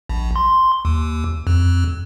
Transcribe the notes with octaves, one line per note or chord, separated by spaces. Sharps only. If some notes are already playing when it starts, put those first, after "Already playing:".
A#1
C6
D#2
F2